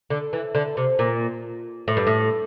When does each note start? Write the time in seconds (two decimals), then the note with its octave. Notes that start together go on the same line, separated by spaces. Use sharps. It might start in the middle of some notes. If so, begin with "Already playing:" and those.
0.10 D3
0.33 E3
0.55 D3
0.77 C3
0.99 A#2
1.88 A2
1.97 G2
2.07 A2